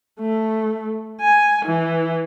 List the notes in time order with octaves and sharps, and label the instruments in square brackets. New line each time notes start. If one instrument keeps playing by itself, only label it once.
[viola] A3
G#5
E3